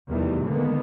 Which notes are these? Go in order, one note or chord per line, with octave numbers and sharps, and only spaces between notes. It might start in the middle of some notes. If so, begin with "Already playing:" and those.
F1 E2 D#3 E3 G3
D3 D#3 G#3 A#3 B3